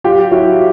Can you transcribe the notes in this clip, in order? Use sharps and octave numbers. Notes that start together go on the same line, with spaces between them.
F#3 F4 G4
F#3 E4 F#4